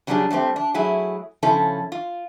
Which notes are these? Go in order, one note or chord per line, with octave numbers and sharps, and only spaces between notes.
C#3 F#3 G3 A3 D4 G#4
F#3 G3 A3 C4
D4
F#3 A3 E4 G#4
C#3 F3 C#4 E4 A4
F4